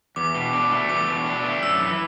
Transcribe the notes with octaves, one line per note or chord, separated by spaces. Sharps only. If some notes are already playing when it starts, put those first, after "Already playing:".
E2 D6
B2
D4
A3
E2 D6
B2
D4
A3
F#2 E6
E3